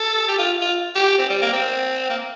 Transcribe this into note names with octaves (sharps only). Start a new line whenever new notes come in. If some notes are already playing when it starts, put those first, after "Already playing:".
Already playing: A4
G4
F4
F4
G4
C4
G3
A#3
C4
A#3